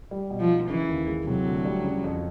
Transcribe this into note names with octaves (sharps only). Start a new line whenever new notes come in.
G3
B2
F3
D#4
C#3 E3
D#2
G#3
C3 F#3
D2
G3
C#3
F2